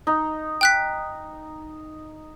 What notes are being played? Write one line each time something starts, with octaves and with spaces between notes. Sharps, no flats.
D#4
G5 F#6 B6